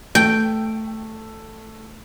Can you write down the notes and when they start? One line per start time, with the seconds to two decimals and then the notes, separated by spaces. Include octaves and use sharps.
0.15 A3 G5